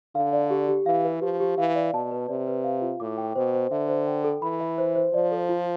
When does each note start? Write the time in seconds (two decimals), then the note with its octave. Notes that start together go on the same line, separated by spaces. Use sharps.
0.15 D3 F5
0.33 D5
0.50 G4
0.68 G4
0.86 E3 F5
1.05 B4
1.22 F3 G4
1.40 G4
1.58 E3 F5
1.75 D5
1.93 B2 A5
2.11 B4
2.28 C3 D5
2.47 B4
2.64 F5
2.82 F4
3.00 A2 D6
3.18 G5
3.35 B2 C5
3.53 C5
3.71 D3 E5
3.88 C5
4.07 G5
4.24 A4
4.42 E3 B5
4.60 E5
4.78 C5
4.95 C5
5.13 F3 D5
5.31 A4
5.49 F4